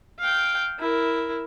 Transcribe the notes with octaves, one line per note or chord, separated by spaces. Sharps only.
F5 G5
E4 A#4